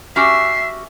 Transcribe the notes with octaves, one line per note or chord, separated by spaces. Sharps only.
C#4 F#4 G4 E5 C7